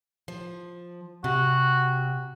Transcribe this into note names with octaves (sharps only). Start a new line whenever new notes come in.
F3
C3 F#4